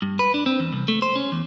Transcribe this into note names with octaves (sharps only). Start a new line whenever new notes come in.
G2
B4
D4
C4
E2
C2
A3
C5
C#4
E2